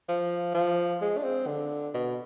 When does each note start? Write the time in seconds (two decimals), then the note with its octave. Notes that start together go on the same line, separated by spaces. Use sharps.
0.09 F3
0.54 F3
1.02 G#3
1.18 D4
1.24 C4
1.47 D3
1.94 B2